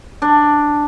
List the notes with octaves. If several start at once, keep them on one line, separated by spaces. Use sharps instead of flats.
D4